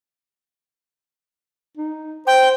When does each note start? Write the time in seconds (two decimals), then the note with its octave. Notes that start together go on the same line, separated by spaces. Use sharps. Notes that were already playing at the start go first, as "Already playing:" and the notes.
1.77 D#4
2.27 C5 G5